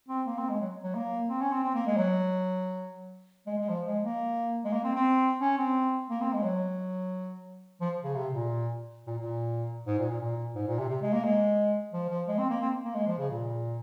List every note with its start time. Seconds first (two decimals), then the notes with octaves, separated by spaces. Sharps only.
0.09 C4
0.26 A#3
0.38 C4
0.49 G#3
0.61 F#3
0.84 F#3
0.95 A#3
1.29 C4
1.41 C#4
1.52 C4
1.64 C4
1.74 A#3
1.86 G#3
1.97 F#3
3.46 G#3
3.58 G#3
3.69 F3
3.86 G#3
4.04 A#3
4.64 G#3
4.72 A#3
4.84 C4
4.95 C4
5.41 C#4
5.58 C4
6.10 A#3
6.21 C4
6.33 G#3
6.43 F#3
7.81 F3
8.04 C#3
8.15 C3
8.33 A#2
9.07 A#2
9.18 A#2
9.87 G#2
9.99 A#2
10.10 A#2
10.21 A#2
10.55 G#2
10.67 A#2
10.79 C3
10.89 C3
11.01 G#3
11.13 A#3
11.24 G#3
11.93 F3
12.09 F3
12.27 G#3
12.38 C4
12.50 A#3
12.61 C4
12.85 A#3
12.95 G#3
13.07 F3
13.18 C#3
13.30 A#2